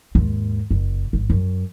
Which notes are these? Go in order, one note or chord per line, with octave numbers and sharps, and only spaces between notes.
D#2 G#2
F#1
G#1
F#2